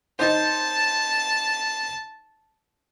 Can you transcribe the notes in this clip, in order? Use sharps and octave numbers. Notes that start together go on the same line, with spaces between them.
D#4 C5 A5